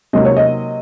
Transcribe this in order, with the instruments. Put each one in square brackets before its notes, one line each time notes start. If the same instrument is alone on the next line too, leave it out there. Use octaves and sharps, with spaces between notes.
[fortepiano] C3 F#3 A#3 D#5
C#5
D#5